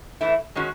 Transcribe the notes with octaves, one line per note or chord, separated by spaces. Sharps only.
E3 A3 E4
D#3 G#3 C#4 F#4